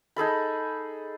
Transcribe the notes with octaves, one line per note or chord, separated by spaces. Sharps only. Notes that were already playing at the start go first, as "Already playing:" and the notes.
D#4 G#4 A4 B5